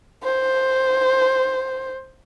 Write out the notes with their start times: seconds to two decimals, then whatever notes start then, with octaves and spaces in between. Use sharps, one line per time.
0.24 C5